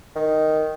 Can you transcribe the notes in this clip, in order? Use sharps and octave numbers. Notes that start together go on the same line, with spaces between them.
D#3